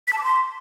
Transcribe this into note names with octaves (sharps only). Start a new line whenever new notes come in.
B6
A5
D6
C6